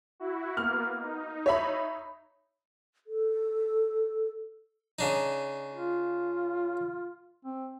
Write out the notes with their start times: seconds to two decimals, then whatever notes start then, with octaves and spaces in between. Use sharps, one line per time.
0.20 E4 F#4
0.57 A#3 B3 F6
0.99 D#4
1.46 C#5 E5 B5
3.07 A4
4.99 C#3 D4 D#4
5.76 F4
7.45 C4